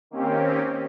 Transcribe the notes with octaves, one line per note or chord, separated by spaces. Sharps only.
D#3 A#3 C4 C#4 G4